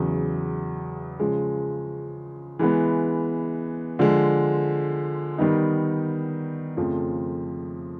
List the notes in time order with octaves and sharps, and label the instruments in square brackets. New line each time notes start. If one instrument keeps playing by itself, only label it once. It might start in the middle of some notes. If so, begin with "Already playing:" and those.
Already playing: [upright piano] E2 C#3 F#3
C#3 F3 G#3
E3 G#3 B3
D3 F3 G#3
D#3 G3 B3 D#4
F2 C#3 F3 A3